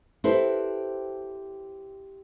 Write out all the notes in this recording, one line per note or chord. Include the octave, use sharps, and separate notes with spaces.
C4 E4 G4 A4 B4 C5